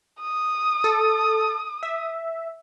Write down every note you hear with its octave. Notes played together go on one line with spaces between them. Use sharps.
D#6
A4
E5